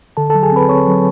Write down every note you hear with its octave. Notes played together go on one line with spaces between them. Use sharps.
D3 A4 A5
A4 A5
F#3
G#4 G#5
C4 B4 B5
C4 C#5 C#6
F#3